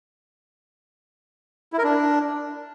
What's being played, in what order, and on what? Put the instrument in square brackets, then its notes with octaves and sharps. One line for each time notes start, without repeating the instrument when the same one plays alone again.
[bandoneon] E4
A#4
D4